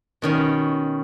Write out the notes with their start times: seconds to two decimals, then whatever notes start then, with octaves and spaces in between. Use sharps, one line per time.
0.22 B2 D#3 C#4